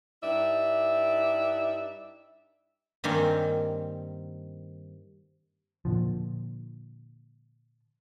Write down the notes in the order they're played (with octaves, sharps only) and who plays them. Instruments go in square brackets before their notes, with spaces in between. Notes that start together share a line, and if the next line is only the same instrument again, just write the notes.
[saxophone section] G2 D#4 E4 D5 E5
[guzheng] G2 D#3 A#3 C4 G#5
[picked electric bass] A#2 D3 F3